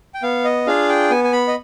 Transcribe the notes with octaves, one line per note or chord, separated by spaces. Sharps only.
G5
B3 F5
D#5
D4 F4 G#4 F5
G5
B3 G#5
G#5
B5
D#5